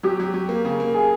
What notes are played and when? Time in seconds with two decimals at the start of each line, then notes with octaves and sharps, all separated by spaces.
0.03 F#3 G4
0.20 F#3
0.34 F#3
0.49 A#3
0.65 C#3
0.80 A#3
0.94 G#4